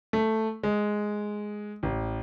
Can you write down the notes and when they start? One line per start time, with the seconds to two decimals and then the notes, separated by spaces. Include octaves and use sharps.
0.13 A3
0.63 G#3
1.83 A1